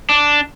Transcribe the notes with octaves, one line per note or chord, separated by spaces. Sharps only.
D4